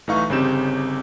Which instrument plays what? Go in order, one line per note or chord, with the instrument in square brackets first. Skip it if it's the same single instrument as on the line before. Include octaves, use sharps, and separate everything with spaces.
[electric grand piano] B1 E3 A3 D#4 F5 C#6
G1 C#3 C4 D#4 G4 E7